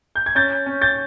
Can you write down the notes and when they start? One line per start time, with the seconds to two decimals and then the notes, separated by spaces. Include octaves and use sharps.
0.15 G6
0.26 G#6
0.35 C#4 G6 A6
0.66 C#4
0.82 G6 A6